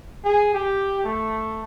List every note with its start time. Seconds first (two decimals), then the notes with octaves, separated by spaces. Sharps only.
0.24 G#4
0.54 G4
1.05 A3